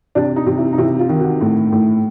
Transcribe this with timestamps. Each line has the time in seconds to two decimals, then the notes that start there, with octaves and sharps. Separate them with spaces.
0.15 C3 D4
0.36 D#4
0.47 C3
0.58 E4
0.73 D#4
0.78 C3 E4
0.99 F4
1.09 D#3
1.20 F#4
1.41 A2
1.72 A2